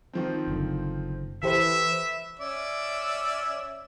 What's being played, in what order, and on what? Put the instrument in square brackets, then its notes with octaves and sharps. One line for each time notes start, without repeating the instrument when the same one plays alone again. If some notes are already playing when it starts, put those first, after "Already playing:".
[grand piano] D#3 F3 C4
[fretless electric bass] F#1 D3
[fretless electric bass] E3 [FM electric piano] E4 G4 C5 [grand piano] A4 B4 [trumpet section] E5
[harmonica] C#4 D5 E5